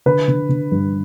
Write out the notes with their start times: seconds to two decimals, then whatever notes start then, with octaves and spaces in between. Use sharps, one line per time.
0.06 D3 B4
0.28 D3
0.49 D3
0.72 G2